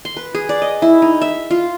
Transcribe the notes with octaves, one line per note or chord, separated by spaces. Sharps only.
C6
B4
G#4
D5
D#5
E4
D#4
E5
F4